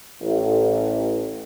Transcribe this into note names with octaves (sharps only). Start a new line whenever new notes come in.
A1